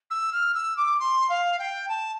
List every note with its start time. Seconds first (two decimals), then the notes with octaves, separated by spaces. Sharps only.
0.10 E6
0.33 F6
0.55 E6
0.77 D6
1.00 C6
1.29 F5
1.59 G5
1.89 A5